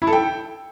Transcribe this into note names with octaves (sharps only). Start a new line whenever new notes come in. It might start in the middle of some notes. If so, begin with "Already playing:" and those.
E4
A4
G5